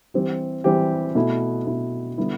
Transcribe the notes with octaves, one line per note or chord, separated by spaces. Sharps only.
E3 G3 C4 G4
E3 G3 C4 G4
B2 A3 E4
B2 A3 E4
D3 G3 B3 E4